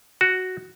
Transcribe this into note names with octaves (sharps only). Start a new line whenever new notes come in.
F#4